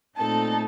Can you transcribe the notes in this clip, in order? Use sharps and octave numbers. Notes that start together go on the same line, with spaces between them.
A#2 A3 C4 D#4 A4 A5